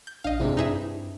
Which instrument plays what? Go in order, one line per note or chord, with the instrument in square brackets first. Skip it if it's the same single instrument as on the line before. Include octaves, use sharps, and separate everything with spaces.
[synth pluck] G6
[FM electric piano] A#1 D4 [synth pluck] D#5 F5
[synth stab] F2 G#2 C3 [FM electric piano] C4 D4 E4
[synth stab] G2 [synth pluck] D#4 G#4 E5